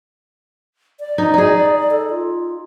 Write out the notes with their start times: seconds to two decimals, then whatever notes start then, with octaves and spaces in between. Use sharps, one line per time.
1.00 D5
1.18 D#4
1.34 D#4 G#4
1.91 A4
2.10 F4